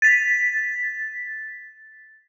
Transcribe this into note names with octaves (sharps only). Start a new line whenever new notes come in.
A6 B6